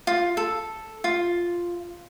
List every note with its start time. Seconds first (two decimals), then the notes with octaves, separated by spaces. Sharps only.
0.07 F4
0.37 A4
1.04 F4